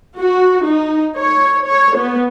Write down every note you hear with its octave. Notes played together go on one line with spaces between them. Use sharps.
F#4
D#4
C#5
C#5
B3